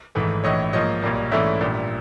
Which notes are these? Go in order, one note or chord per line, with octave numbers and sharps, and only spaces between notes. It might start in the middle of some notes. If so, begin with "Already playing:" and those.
G#1 G#2 E3 A3
A#1 A2 E3 C#5 D#5
G#2 F3 A#3 C#5 D#5
B1 A#2 G3 A#3
G#2 E3 A3 C#4 E4 D5 E5
A#1 A#2 G3